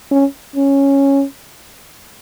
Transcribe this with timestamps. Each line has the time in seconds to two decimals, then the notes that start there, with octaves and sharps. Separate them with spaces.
0.11 C#4
0.56 C#4